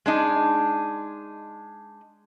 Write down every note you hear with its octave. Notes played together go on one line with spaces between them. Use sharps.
G#3 D4 D#4